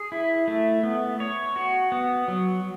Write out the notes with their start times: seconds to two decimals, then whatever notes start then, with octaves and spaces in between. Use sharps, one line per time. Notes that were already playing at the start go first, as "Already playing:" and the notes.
Already playing: G#4
0.12 E4
0.48 A3
0.83 B3
1.20 C#5
1.56 F#4
1.92 B3
2.28 F#3